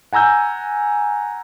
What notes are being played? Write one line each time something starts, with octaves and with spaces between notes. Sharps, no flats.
F#5 G#5 A#5 E6 G6